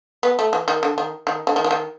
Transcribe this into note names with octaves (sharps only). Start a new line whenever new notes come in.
B3
A3
E3
D#3
D3
D#3
D#3
D3
D#3
E3
D#3